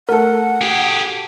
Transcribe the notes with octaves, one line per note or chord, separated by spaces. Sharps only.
A3 A4 A#4 F#5
G4 G#4